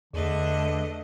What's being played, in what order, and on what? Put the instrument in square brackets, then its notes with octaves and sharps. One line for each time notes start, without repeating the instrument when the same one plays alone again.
[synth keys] E2 B4 [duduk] D3 [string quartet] A3 D4 D#5